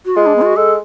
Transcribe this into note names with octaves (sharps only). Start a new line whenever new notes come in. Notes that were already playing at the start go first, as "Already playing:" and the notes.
F#4
G#3 F4
D4
B3
F4
F#4
G#3 A4